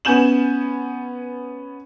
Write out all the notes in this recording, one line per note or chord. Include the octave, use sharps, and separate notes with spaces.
B3 C#4 G#5 G6 E7 F#7